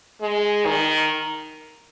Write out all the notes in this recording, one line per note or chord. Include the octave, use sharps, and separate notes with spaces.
G#3
D#3